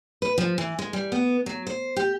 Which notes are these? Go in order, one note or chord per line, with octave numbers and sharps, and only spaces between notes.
B4
F3
E3
G#3
G3
B3
F#3
C5
G4